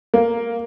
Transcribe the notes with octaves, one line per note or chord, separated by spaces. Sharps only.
A#3